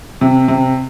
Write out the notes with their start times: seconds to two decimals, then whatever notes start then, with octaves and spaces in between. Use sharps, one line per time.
0.21 C3
0.48 C3